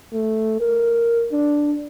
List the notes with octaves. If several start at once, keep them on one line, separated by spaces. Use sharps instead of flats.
A3
A#4
D4